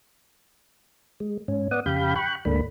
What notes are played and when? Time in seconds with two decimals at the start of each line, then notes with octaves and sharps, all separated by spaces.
1.20 G#3
1.48 G#2 C#4
1.71 B3 D5 F#5 D#6
1.86 F2 C#3 G4 F5 B5 G6
2.16 G5 B5 C#6 F#6
2.45 D2 G#2 A3 A#3 D4 B5